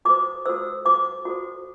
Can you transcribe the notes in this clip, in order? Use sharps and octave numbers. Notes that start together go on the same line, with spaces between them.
F#4 A4 C5 D6
F#4 A4 C5 E6
F#4 A4 C5 D6
F#4 A4 C5